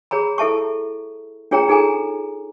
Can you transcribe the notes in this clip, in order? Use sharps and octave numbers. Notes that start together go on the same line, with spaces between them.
G#4 C#5 A#5 B5
E4 A4 E5 A5 C#6
D4 F4 G#4 C#5 G5 A#5
D#4 G#4 A4 G#5 A#5